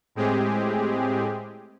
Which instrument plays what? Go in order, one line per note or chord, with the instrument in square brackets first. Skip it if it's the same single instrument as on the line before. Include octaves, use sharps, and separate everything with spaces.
[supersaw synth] A2 G#3 C4 G4 G#4